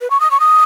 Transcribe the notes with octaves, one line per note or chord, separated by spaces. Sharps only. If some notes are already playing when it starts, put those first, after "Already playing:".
B4
C#6
D#6
C#6
D#6